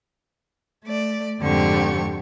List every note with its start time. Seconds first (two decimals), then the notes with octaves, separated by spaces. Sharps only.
0.85 A3 D5
1.41 F2 G#2 D3 C4 G4 C#6